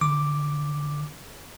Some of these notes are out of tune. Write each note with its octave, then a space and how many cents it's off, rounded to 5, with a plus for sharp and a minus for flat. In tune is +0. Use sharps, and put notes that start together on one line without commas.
D3 +0 D6 +0